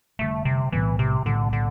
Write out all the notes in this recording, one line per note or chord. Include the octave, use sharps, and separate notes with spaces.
F1 E2 D3 G3 A3
C3
B1 A2 E3 G3 B3
C3
B1 A2 D3 G3 B3
D3